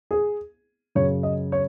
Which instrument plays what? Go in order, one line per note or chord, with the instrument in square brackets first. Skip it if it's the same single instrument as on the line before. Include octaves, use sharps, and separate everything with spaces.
[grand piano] G#4
F#2 C#3 C#5
D#5
C#5